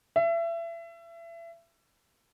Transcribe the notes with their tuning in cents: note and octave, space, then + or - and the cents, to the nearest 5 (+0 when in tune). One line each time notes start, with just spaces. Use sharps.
E5 +30